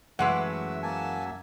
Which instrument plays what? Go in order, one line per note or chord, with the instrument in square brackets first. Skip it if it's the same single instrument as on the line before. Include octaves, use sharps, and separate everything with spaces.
[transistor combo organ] F#2 E5 [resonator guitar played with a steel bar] E3 G#3 B4 [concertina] A3 [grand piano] F#5
[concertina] A#3 G#5 A5